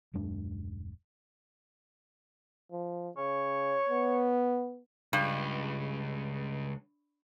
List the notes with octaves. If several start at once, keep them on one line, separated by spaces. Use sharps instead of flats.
D#1 F#2 G#3 D4
F3
C#3 C#5
B3
C#2 G2